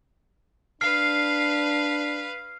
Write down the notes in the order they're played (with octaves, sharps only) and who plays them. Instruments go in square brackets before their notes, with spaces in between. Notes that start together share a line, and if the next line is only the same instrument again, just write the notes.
[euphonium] D4 [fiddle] B4 F5 [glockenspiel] F6 C7